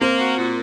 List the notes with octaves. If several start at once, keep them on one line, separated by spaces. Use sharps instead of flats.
A#3 C4
F#4
A#2